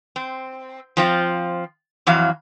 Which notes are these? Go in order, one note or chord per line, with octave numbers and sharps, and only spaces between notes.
C4
F3 C4 F4
F2 E3 F#3 F5